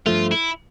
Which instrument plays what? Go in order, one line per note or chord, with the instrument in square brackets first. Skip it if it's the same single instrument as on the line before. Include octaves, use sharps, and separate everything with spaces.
[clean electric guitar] G2 F3 A3 [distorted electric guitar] F4
[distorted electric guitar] E4